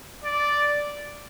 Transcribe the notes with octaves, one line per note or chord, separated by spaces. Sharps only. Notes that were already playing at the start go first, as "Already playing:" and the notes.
D5